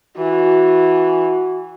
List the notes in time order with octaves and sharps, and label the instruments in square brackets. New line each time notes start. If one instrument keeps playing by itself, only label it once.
[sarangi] E3 [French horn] F#4